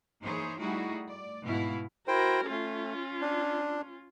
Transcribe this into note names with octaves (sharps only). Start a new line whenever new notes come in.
E3 A#3 D#4 G#4 C5 C#5
G3 A3 D#4 E4 F#4 G#4
D5
G#2 B2 B3 E4 F5
E4 F#4 A#4 C5 G5
A3 C#4 F4
D4